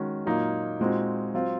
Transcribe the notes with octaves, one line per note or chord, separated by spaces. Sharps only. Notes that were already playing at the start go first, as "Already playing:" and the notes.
Already playing: D#3 G#3 C#4 F#4
A#2 F#3 A#3 D#4
A#2 G#3 C4 D#4 F#4
F#3 C4 F4